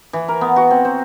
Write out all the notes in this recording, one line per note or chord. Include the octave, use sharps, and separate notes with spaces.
E3
A#4
B3
F#4
C4
C5